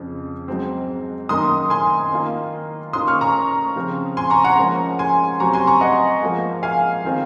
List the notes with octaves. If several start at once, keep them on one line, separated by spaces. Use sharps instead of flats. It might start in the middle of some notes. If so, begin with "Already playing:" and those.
Already playing: F2 C#3 F3
G#2 F#3 C4
F#2 D#3 A#3 D#4 C6 D#6
G#5 C6
D#3 A#3 F4
D#3 A#3 C#4 F4 C6 D#6
C#6 F6
A#5 C#6
C#3 F3 C4 F4
G#5 C6
A#5 C#6
F#5 A#5
G#2 F3 A#3 C#4
G#5 C6
C3 F#3 C4 A#5 C#6
G#5 C6
A#5 C#6
D#5 F#5
G#2 F3 A#3 F4
F5 G#5
D#3 G#3 C4 F4